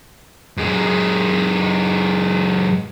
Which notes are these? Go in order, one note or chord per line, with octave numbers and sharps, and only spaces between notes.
F#2 G#3